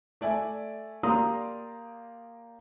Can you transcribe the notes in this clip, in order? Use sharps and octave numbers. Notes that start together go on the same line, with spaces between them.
A3 D5 E5 G#5
A#3 G4 D5 A#5 C6 D#6